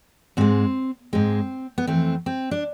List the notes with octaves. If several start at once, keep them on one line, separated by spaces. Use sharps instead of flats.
G#2 G#3 C4
G#2 G#3 C4
B3
F2 E3 A3 C4
C4
D4